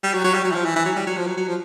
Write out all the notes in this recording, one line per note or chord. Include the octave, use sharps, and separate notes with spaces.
G3
F#3
F#3
G3
F#3
E3
F3
E3
E3
F#3
G3
F#3
F3
F#3
F#3
F3